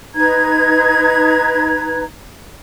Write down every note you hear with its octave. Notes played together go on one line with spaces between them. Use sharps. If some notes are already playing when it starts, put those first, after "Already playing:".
D#4 B4 A#5 G#6